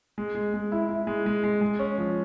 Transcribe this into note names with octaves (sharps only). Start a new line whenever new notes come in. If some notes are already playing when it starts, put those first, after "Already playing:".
G#3
G#3
G#3
E4
E4
G#3
G#3
G#3
G#3
C#4
F3